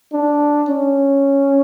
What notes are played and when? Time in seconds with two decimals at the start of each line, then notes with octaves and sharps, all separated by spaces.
0.13 D4
0.69 C#4